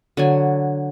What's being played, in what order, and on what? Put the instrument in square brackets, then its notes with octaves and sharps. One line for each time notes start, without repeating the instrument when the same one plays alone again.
[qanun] D3 F#3 G#5